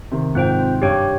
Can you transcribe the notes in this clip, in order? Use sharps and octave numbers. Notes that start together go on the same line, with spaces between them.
C3 D#3
G#2 C4 F4 C5 G5
G2 G4 C#5 G5